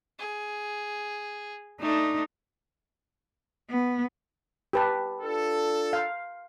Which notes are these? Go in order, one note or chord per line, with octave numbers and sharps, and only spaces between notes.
G#4
A3 D4 D#4
B3
G4 B4 A5
D4 F4 A4
F5